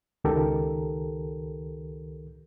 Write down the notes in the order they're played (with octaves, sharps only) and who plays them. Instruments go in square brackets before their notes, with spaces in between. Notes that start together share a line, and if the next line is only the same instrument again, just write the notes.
[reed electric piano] C#2 D#3 G4 A4 A#4